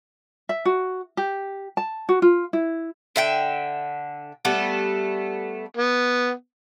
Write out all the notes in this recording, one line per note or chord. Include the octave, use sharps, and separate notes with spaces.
E5
F#4
G4
A5
F#4
F4
E4
D3 E5 G5
G3 A3 B3 A4
B3